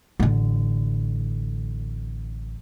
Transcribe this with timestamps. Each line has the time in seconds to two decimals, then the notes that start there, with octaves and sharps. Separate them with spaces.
0.19 A1 D3